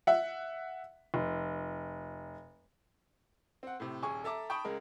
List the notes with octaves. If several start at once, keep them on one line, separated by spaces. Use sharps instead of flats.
E5 F#5
F1
C4 F#5
A2 C3
D#1 G#4 G#5 C#6
A4 E5 A5 A#5 D6
G5 A5 B5 C#6 D#6
C#2 G#3 A#4